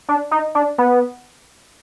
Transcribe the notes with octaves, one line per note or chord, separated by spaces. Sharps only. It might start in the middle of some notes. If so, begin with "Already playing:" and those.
D4
D#4
D4
B3